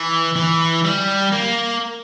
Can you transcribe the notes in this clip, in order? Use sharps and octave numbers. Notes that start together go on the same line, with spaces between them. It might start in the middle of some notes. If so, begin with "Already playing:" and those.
Already playing: E3
E3
G3
A#3